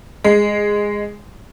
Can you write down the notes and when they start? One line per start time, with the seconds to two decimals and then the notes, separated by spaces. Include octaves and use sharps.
0.24 G#3